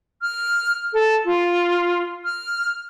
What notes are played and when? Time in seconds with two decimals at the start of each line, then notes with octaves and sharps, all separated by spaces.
0.22 F6
0.93 A4
1.25 F4
2.25 F6